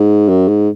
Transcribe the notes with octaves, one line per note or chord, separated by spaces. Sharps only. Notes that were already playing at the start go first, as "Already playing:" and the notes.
Already playing: G#2
F#2
G#2